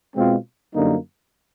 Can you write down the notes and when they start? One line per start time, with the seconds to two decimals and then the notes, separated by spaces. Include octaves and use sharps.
0.14 B2 G#3 C4 F4
0.74 F#2 D3 G3 A#3 D#4